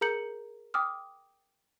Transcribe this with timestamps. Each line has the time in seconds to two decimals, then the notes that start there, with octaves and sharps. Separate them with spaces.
0.01 G#4 A#4 A#5 G6 C#7 F#7
0.74 G5 D6 D#6 F6